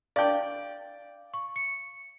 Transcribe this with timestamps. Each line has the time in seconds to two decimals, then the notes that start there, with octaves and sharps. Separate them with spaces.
0.16 D5 F5 G5
1.34 C#6
1.56 C#7